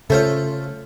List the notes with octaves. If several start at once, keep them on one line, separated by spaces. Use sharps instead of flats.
C#3 A3 F4 A4 C5 C#5